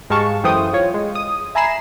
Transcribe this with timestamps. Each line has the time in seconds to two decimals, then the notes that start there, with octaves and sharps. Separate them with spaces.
0.10 G#2 G#3 G4 F5 A5 C#6
0.43 F#2 E3 A4 C5 G5 D#6
0.73 F4 C#5
0.94 G#3
1.15 D#6
1.55 E5 G#5 A#5 B5 C7 E7